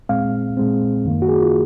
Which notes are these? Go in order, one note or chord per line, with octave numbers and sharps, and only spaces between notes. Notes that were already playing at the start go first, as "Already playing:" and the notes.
A#2 G#3 C4 F5
A#2 G#3 C4
F#2 D#3 A#3
F#4
G#4
F4